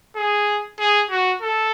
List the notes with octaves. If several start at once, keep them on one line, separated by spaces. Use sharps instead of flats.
G#4
G#4
F#4
A4